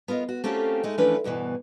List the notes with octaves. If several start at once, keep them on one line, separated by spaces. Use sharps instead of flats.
B3 F4 A#4 D#5
F#4
A3 A#3 C4 C#4 F4 G4
G#3 A3 D#4
E3 F3 A3 C#4 D4 B4
D2 G2 B2 E3